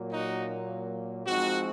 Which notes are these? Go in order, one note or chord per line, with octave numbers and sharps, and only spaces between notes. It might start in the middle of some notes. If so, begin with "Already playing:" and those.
Already playing: A#2 F#3 A#3
D#4 F#4
F3 G#3 C4 D#4 F#4